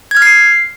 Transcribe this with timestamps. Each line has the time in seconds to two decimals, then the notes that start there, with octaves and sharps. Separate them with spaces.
0.11 G#6
0.17 F6
0.22 C7